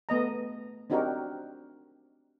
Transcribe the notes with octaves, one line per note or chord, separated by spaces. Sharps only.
A3 B3 D#5 A#5
C4 D4 D#4 F#4 G4 A#4